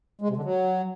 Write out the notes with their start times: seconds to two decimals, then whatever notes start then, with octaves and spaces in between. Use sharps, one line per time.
0.21 G#3
0.29 C3
0.37 D3
0.44 F#3